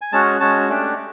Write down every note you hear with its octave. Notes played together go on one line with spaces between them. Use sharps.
G#5
G#3 C#4 F#4 A5
G#3 C#4 F#4 A5
A3 D4 G4